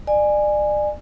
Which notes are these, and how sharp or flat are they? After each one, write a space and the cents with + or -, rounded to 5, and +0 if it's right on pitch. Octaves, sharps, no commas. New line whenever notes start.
D5 +35 G#5 +0